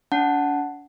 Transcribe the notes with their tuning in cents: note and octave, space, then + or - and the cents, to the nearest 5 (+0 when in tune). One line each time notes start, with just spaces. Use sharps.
D4 -45 F#5 +0 A5 +0